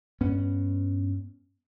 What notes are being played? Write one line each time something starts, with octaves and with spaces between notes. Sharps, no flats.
G2 B3 C#4